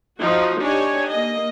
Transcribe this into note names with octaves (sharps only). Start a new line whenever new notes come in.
F3 D#4 F#4
D4 D#4 G4 C#5 G#5
A#3 D#5